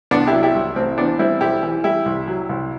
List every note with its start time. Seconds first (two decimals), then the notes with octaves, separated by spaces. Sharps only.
0.11 C2 B3 D4
0.27 E4 G4
0.33 F#3
0.43 E4 G4
0.54 C2
0.76 A1 C4
0.98 E3 B3 D4
1.19 G3 C4 E4
1.41 B1 E4 G4
1.63 E3
1.84 G3 E4 G4
2.06 C2
2.28 F#3
2.49 C2